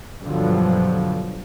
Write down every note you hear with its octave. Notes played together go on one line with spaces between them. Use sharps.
G2 B2 D3 F3 F#3